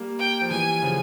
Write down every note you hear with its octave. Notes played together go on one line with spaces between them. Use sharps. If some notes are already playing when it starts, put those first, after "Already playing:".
Already playing: G3 A#3
G5
F3
E3 G3 G#5
C#3 F3